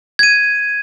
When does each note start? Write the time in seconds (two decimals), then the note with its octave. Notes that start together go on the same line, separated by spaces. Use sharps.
0.19 G#6 D#7